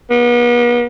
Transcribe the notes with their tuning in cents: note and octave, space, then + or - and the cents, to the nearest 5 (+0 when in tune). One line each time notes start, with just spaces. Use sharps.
B3 -40